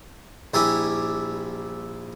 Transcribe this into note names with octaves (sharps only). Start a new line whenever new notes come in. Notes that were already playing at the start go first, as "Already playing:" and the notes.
A#1 G3 E4 G4 G#5